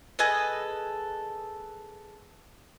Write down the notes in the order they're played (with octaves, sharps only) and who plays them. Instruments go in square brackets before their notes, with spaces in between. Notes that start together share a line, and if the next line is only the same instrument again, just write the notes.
[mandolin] G#4 A4 B4 D#5